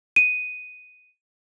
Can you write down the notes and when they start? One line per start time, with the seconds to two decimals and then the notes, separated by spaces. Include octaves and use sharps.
0.16 D#7